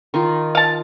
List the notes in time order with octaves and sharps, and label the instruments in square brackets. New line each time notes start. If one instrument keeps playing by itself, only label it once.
[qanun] D#3 D#4 F4
[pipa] F5 A5